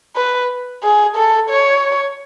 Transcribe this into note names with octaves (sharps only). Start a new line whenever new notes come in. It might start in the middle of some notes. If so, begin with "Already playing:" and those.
B4
G#4
A4
C#5